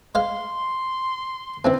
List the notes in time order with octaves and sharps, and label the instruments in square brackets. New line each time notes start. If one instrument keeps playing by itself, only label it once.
[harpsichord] G#3 C5 F5 [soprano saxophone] C6
[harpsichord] D3 E3 C#4 [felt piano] C4